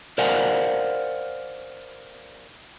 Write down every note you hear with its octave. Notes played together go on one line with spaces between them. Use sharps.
A#4 C5 D5 F5 F#5 G#5